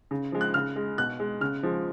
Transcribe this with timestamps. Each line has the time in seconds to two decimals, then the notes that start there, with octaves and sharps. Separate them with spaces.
0.11 C#3
0.32 F3 G#3
0.41 F#6
0.54 C#3 F6
0.76 G#3
0.98 B2 F#6
1.20 G#3
1.41 C#3 F6
1.63 F3 G#3